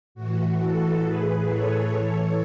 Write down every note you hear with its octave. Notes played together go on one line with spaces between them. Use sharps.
A2 E3 F#4
F#4 A4
A2 E3 G#4 B4
A4 C#5
A2 E3